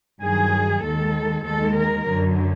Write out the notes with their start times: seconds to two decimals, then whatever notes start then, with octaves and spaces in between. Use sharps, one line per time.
0.23 G2 D#3 F#3 G#4
0.84 D#2 D#3 G#3 A4
1.45 D#2 D#3 G#3 A4
1.76 A#4
2.07 F#2 D3 F#3